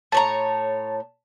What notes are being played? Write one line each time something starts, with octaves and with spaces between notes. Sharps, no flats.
A2 C#5 A5 A#5